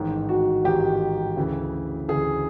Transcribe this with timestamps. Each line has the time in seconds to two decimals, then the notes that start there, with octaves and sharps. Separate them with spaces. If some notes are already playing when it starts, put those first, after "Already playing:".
Already playing: A1 G#2 D#3
0.29 F#4
0.64 A1 G#2 D#3 G4
1.37 D2 C#3 E3
2.08 D2 C#3 E3 G#4